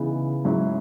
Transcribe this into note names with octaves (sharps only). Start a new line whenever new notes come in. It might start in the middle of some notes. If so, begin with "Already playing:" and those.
Already playing: C#3 E3 B3 D#4
G#2 F#3 C#4 E4